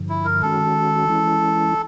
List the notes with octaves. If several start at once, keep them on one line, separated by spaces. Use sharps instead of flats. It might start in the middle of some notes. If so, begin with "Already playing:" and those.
Already playing: G2 D3 F3
E4
A#4
D#3 G#3 C#4 F#4 A4
E3 G#3 C#4 E4